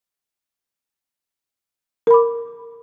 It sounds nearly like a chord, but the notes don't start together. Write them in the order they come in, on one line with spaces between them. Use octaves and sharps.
A#4 B5 D6